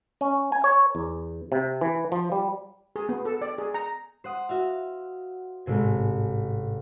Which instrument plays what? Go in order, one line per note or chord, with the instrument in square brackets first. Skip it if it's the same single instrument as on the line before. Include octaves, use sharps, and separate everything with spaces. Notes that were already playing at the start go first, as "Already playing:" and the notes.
[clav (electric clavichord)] C#4
G#5
C#5
E2
C3
E3
F3
G3
[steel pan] G#4
B3
A4
D5
G#4
A#5
[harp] C5 F#5 D#6
F#4 E5 F5
A1 G#2 C3 G#5